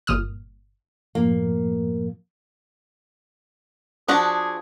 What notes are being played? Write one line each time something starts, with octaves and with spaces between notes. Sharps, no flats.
G1 A#2 D#6 F6
F#2 A2 F3 A#3
F3 D4 F#4 G#4